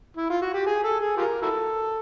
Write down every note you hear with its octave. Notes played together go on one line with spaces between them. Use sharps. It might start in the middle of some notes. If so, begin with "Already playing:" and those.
E4
F4
F#4
G4
G#4
A4
G#4
F4 G4 A#4
E4 F#4 A4